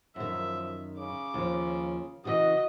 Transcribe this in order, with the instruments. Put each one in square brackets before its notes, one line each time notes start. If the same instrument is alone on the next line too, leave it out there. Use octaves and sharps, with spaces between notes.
[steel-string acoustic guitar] F#2 D#3 [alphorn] F3 [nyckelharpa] E5
[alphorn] C#3 [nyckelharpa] D6
[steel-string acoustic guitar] D#2 F3
[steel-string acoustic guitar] C#3 E3 [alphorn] F#4 [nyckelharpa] D#5